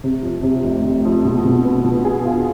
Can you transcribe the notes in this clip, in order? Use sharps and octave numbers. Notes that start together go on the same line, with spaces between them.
C3
F2
C3
F1
F1
F2
B2
B2
B3
B2
G#4
F4